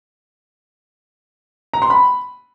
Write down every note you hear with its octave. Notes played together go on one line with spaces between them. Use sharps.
A#5
C6
B5